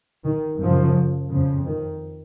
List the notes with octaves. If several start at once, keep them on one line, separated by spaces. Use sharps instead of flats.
D#3
F#2 C#3 F3
F2 C#3 F3
D#3